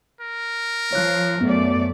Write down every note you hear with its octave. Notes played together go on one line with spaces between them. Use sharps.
A#4
F3 C#5 F#6
F#2 A3 B3 D5